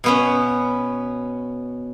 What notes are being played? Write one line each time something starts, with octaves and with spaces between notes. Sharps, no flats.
B2 B3 C#4